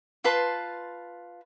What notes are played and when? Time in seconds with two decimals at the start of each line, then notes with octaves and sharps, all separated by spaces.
0.24 F4 B4 A5 C6